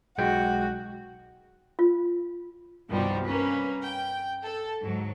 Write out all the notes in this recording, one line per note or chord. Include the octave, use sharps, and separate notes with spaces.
B1 G#3 F#4 G5
F4
C2 G2 B2 D#3 F3 G3
A#3 C#4 B4
G5
A4
D2 G#2 F#3